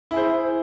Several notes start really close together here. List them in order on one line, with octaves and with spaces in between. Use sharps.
E4 G#4 C5